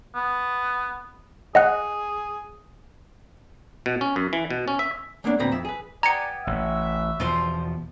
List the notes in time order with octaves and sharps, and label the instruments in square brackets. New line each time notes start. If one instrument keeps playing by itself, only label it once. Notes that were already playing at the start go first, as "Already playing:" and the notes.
[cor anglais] B3
[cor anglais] G#4 [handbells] D#5 F#5 F#6
[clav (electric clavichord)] B2
C#4
F#2
E3
B2
C#4
E5
[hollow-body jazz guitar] G#3 A#3 B3 C#4 D4
D2 A#2 C4 B4 A#5 B5
F2 E5
G#4 B4
[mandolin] B3 G4 G#5 [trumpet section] D5 [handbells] A#5 C#7
[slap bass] A1 [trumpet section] F#4 E5
[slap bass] E2 B2 F3 [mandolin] F4 C5 C6